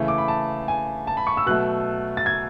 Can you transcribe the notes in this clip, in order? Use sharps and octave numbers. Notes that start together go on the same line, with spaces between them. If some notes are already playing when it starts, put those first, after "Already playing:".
Already playing: C#3 E3 A3
D6
B5
A5
G#5
A5
B5
C#6
E6
B2 F#3 A3 F#6
A6
G#6